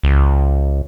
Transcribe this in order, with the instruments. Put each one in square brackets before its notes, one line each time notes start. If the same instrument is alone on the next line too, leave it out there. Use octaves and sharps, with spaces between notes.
[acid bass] C#2